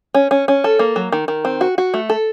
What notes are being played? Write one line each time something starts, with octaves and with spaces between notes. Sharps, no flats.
C#4
C#4
C#4
A4
A#3
F#3
D#3
D#3
C4
F#4
F#4
A3
A4